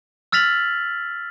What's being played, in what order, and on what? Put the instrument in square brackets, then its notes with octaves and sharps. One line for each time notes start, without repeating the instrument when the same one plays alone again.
[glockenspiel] E6 F6 A6 B6 F7 F#7